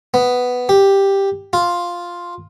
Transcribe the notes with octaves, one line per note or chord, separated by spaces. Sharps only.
B3
G4
F4